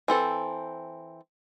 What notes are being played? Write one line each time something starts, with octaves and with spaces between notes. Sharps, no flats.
E3 C4 A4